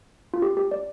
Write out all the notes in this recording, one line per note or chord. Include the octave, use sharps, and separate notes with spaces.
F4
G4
G4
D5